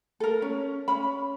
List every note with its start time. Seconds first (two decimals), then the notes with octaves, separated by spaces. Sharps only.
0.20 A4 A#4
0.42 C#4
0.88 C#4 B5